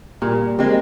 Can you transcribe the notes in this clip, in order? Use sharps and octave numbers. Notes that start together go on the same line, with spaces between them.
A#2 G3 A#3
G3 G#3 A#3 C4